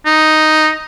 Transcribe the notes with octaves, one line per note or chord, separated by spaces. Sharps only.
D#4